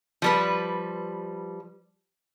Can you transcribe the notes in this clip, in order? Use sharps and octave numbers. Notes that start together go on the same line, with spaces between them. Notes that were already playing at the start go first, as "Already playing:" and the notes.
F3 G3 B4